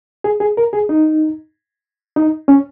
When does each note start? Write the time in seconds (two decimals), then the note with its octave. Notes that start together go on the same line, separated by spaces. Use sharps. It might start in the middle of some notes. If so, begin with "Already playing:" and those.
0.24 G#4
0.40 G#4
0.57 A#4
0.73 G#4
0.89 D#4
2.16 D#4
2.48 C#4